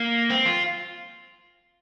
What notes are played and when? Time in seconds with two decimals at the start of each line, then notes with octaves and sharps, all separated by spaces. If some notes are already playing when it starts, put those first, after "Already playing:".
Already playing: A#3
0.30 C4
0.45 F4